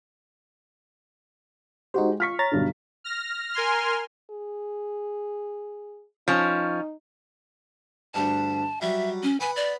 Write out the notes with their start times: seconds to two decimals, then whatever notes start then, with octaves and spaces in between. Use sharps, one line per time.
1.94 G#3 D#4 F#4 G4 C5
2.20 F4 C#6 F6 B6
2.39 C#5 A#5 A6
2.52 B1 G2 D3
3.04 F6 A#6
3.53 A#4 G#5 C6 F6
4.30 G#4
6.28 F3 C#4 D#4
8.14 D2 G2 A5
8.81 F#3 G3 E5
9.23 C#4
9.40 B3 G#5 B5
9.56 D5